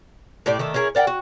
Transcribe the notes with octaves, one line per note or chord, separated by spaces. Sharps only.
A2 G4 D5
D#3 A3 E5
C#4 E4 G#4 A#4
A#4 D5 F#5 G5
F#4